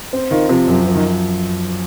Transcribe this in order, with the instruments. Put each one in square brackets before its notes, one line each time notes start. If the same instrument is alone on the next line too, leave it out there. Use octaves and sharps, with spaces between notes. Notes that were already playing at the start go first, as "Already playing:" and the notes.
[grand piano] C4
[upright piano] D#3 [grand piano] F4
[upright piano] C3 [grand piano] F3
[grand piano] F#2
F3
[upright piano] D#3